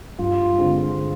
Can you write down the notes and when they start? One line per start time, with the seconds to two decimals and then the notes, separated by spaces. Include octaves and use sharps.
0.19 G2 F4
0.58 D3 G#3 C4